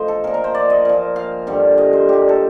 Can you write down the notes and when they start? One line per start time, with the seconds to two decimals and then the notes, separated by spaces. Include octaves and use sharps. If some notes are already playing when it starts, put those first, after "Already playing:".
Already playing: A2 F3 C5 D#5
0.08 A4
0.24 A#2 F3 A#4
0.34 A#4
0.44 C5
0.55 D5
0.70 D#5
0.85 A#2 F3
1.16 F5
1.47 G2 D3 G3
1.78 D#5
1.93 C5
2.08 A#2 G3 G4
2.29 A4